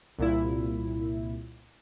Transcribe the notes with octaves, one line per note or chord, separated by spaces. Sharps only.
C2 A#2 E4